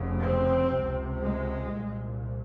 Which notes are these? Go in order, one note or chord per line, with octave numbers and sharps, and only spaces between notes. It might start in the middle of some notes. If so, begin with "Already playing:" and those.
Already playing: F1 F2 C#3
C4
C#2 C3
G#3
C2 A#2